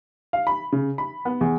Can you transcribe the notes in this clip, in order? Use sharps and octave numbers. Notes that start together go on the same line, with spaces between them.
F5
B5
C#3
B5
B3
E2